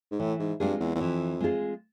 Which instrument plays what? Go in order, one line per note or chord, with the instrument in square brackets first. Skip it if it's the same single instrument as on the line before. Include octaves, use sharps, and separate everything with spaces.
[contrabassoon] G#2
[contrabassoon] A2 [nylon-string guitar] E3
[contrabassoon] G#2
[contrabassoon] G2 [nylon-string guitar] G#3 C4 F4 G#4
[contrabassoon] E2
E2
[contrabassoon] F2 [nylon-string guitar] E3
[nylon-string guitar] G#3 C4 F4 G#4